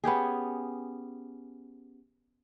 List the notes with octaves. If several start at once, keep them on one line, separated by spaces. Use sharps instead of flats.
B3 C#4 G4 G#4